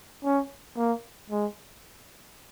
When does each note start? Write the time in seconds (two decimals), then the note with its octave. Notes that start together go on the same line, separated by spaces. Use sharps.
0.25 C#4
0.77 A#3
1.30 G#3